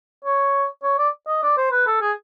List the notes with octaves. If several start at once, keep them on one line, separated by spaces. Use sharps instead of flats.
C#5
C#5
D5
D#5
D5
C5
B4
A4
G#4